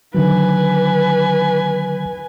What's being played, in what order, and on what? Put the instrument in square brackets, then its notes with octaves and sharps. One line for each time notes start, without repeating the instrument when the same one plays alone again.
[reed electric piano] D3 D#3 F#3 [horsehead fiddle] B4 G#5